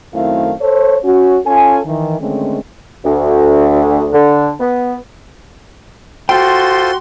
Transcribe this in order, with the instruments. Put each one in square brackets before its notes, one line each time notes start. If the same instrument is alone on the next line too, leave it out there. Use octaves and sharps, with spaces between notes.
[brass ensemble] F#2 D#3 A3 C4 E4 F5
A4 C5 C#5
C#4 F#4
C#4 F4 A4 G#5
D#3 E3
D3 D#3 G#3 A3 C4 C#4
[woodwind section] D2
D3
B3
[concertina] F4 A4 C5 [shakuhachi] F#4 [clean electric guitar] G5 [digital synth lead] C6